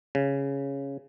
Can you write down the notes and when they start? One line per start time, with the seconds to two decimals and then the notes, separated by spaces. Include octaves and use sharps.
0.15 C#3